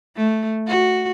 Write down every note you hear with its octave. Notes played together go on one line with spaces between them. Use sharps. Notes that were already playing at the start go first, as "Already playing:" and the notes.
A3
F#4